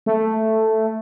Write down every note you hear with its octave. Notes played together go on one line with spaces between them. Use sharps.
A3